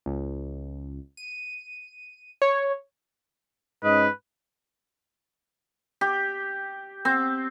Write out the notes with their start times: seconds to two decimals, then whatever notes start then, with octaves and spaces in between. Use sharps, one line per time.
0.06 C#2
1.17 D#7
2.42 C#5
3.83 G#2 C#4 B4 D#5
6.01 G4
7.05 C4